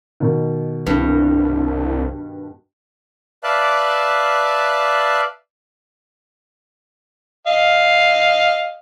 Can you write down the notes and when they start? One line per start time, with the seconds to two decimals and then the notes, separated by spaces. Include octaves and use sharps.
0.20 B2 D#3
0.87 C2 G2 B4
3.44 B4 D5 E5 F5 A5 F#6
7.47 D#5 F5